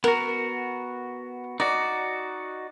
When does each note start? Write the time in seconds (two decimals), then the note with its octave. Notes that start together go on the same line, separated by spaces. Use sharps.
0.04 B3 F#4 A#4
1.60 D#4 F#4 D5